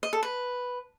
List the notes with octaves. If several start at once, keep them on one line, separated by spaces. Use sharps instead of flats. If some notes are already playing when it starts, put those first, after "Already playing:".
D#5
A4
B4